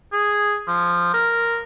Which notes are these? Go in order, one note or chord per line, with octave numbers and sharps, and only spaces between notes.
G#4
F3
A#4